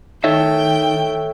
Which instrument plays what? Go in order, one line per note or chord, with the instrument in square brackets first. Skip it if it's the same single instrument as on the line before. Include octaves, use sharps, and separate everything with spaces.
[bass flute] D#3 [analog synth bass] D#4 [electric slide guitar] A4 C#5 E5 [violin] G5